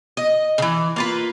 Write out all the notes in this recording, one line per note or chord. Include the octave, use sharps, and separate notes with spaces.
D#5
C#3 E3
A#3 F4 B4